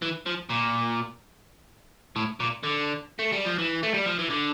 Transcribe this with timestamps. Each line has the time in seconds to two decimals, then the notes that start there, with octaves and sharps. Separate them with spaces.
0.02 E3
0.26 F3
0.50 A#2
2.16 A2
2.40 A#2
2.63 D3
3.19 A3
3.33 G3
3.46 F3
3.59 E3
3.83 A3
3.94 G3
4.06 F3
4.19 E3
4.30 D3